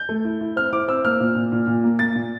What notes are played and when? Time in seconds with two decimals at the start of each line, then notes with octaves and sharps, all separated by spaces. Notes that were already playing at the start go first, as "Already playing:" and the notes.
Already playing: G6
0.09 A3
0.25 E4
0.41 E4
0.56 C4 F6
0.73 E4 D6
0.88 C4 E6
1.04 A#3 F6
1.20 A#2
1.35 A#2
1.52 A#2
1.67 A#2
1.84 A#3
1.99 A#3 A6
2.15 A#2